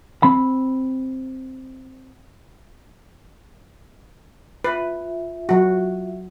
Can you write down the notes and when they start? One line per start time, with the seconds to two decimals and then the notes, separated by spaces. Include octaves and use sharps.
0.23 C4 B5
4.64 F4 B4 E5
5.49 F#3 F#4